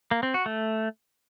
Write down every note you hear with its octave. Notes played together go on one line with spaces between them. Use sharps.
A#3
C4
F#4
A3